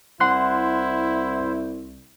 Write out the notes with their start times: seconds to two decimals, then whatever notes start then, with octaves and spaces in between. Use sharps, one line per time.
0.20 C2 E4 C5 F#5 C6 F#6